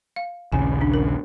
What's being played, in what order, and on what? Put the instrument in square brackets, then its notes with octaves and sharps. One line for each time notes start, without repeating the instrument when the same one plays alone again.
[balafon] F5
[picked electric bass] A#1 D#2 C#3 [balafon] G#5
[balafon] D4
A#4